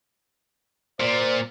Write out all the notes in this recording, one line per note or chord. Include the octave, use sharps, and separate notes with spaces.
A#2 C5 D5